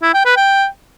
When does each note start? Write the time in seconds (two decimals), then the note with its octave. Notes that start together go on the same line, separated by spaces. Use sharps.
0.02 E4
0.14 G5
0.25 B4
0.37 G5